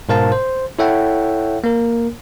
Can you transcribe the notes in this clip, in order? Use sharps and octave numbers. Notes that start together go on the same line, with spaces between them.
G#2 B2 A#4 C5 F5 A5
C5
E4 A4 C#5 E5 F#5 G5
A#3 A#4